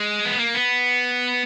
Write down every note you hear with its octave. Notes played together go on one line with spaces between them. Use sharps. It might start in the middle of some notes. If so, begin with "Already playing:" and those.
Already playing: G#3
B3
A#3
B3